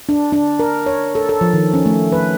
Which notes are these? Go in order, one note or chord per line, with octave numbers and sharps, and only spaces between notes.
D4
D4
A#4
C#5
A4
A4
F3
D#3
C#4
A3
B4